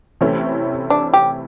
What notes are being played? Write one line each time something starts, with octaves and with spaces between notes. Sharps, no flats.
C3 E3 A3 C#4 E4
D4
G4